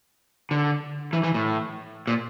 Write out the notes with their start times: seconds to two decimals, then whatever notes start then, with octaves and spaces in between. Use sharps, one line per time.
0.51 D3
1.13 E3
1.23 E3
1.34 A2
2.07 A#2